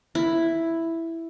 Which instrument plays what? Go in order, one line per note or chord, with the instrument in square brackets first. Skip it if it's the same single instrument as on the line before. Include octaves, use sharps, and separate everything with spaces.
[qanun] E4